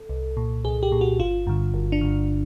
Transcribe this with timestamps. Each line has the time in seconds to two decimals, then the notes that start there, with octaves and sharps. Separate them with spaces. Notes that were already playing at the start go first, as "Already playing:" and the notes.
Already playing: A4
0.09 C2
0.37 A#2
0.65 C2 G#4
0.83 G4
0.92 A#2
1.01 F#4
1.19 G1 F4
1.47 G2 D3
1.74 G1
1.92 D4
2.01 G2 D3